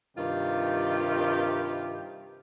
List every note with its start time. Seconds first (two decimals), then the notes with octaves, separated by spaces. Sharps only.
0.17 G2 C3 D#3 F4 G4